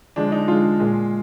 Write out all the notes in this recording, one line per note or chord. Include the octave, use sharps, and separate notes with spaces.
D3 F3 G#3 D4
D#4
D3 F3 G#3 F4
A#2 G#3